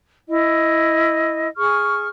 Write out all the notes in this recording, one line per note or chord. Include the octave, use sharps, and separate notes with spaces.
E4 D#5
G#4 C#6 F6